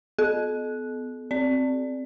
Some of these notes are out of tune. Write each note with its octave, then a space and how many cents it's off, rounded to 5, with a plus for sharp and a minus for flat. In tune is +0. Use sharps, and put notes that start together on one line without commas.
B3 +30 A4 -40
C4 +0 D5 +0